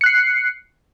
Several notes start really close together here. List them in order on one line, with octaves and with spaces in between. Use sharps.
C#7 F#6 C7